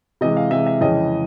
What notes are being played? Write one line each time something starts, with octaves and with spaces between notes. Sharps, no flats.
C3 E3 G#3 D#5
F5
C3 E3 G#3 E5
E5
F2 C#3 E3 G#3 C#4 D#5